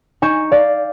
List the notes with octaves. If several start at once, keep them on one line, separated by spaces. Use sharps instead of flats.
D#4 G#5 C#6 G6 E7
D5 F5